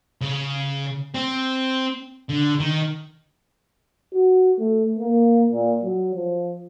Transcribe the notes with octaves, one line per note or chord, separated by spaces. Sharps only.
C#3
C4
D3
D#3
F#4
A3
A#3
A#2
F#3
F3